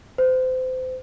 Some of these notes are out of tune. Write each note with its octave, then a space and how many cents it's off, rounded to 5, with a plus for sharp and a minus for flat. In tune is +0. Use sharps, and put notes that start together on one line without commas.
C5 -30